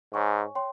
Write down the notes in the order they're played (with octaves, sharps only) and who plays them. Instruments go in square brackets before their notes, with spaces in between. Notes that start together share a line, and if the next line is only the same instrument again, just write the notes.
[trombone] G#2 [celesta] C#5 G#5 C#6
[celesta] C#5 G5 C6